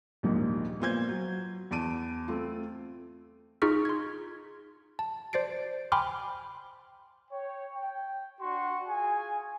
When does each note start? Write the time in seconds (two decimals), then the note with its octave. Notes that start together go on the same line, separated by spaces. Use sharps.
0.23 A#1 D#2 G#2 F3
0.80 A#2 B3 F4 C5 G6 G#6
1.09 F#3
1.71 E2 A5 D7 D#7
2.28 A3 C4 F4
3.62 D#4 F4 G#4 C#6 F6 B6
3.85 C6 G#6
4.99 A5
5.33 C5 D5 A6 C7 D7
5.92 G5 G#5 B5 C6 D6 F6
7.31 C#5 G5
7.74 G5
8.40 D4 F#4 C6 C#6
8.87 F4 G#4 G#5